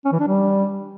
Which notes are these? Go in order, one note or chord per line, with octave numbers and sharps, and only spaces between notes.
C#4
E3
D4
G3